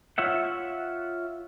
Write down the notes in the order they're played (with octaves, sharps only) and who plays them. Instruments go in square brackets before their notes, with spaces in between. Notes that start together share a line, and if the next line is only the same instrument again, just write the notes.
[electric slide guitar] F4 C#5 E5 F#5